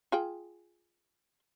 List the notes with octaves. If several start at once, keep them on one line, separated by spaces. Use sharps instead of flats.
F4 G#4 G5